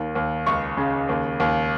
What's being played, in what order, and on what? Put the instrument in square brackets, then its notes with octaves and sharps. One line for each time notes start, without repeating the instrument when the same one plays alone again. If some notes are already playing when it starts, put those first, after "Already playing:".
Already playing: [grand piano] D#2 D#3
D#2
C#2 C#6
C#3
D#2
D#2